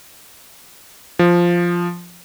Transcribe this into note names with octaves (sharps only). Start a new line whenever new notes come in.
F3